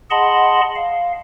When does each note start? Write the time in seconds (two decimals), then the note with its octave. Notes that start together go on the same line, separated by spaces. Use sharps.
0.11 G#4 D#5 F#5 A5 B5 C6
0.75 F5